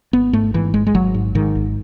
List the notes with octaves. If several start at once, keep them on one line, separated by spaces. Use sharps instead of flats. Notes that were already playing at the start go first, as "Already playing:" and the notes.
G#1 B3
G#2 A3
G#2 E3
G#1 G#3
G#3
G#1 F#3
G#2
G#2 D#3
G#1